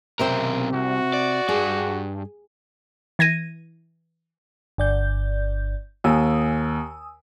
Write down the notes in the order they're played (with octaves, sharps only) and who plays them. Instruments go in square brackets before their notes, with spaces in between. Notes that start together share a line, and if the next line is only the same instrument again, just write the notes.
[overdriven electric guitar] B1 A#4 [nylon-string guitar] C3 C4 C5
[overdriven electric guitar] C2 [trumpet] F#4
[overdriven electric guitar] D5
[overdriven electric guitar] G2 D5 [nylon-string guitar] G#4
[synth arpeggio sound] E3 G#6 A#6 D#7
[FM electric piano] G1 D5 G6
[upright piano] D#2 [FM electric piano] G#5 D#6 E6